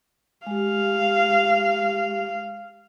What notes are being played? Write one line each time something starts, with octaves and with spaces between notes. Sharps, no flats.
G#3 G4 F5